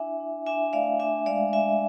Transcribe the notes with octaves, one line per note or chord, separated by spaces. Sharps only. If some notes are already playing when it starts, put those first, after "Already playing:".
Already playing: D4 E4 E5 G#5
D4
D4 E5 G#5
A3 D5 F5
D4 E5 G#5
G#3 D5 F5
D4 E5 G#5